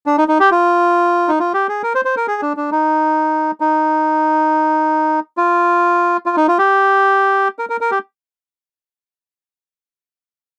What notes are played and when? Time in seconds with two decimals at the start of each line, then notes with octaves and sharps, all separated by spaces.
0.06 D4
0.18 D#4
0.28 D#4
0.40 G4
0.51 F4
1.28 D#4
1.39 F4
1.54 G4
1.69 G#4
1.83 A#4
1.95 C5
2.05 C5
2.17 A#4
2.28 G#4
2.42 D4
2.57 D4
2.72 D#4
3.60 D#4
5.37 F4
6.26 F4
6.37 D#4
6.48 F4
6.59 G4
7.59 A#4
7.70 A#4
7.81 A#4
7.91 G4